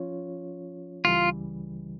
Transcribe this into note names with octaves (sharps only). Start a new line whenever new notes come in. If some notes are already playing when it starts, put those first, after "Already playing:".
Already playing: F3 C#4 F4 C#5
C#2 C#3 E3 G3 F4